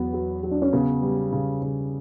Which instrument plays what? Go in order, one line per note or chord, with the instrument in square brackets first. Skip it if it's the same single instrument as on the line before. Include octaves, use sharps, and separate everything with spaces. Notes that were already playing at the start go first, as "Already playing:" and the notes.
Already playing: [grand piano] E2 F#3 [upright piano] B3
[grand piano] F#3
F#3
[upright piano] D4
C#4
[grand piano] C#3 [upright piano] B3
[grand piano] G3
C#3
C#3